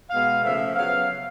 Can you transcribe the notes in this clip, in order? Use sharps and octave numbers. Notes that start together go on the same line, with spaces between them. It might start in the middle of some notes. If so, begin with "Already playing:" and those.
B2 G#3 B3 F5
C#3 F3 A3 E5
C#3 F#3 B3 F5